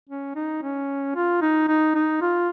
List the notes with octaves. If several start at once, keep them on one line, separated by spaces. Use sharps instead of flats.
C#4
D#4
C#4
F4
D#4
D#4
D#4
F4